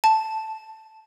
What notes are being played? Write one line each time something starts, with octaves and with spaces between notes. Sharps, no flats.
A5